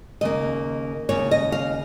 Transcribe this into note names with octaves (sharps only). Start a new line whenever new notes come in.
D#2 C#3 A#3 D#5
D#2 C#3 A#3 C#5
D#5
F5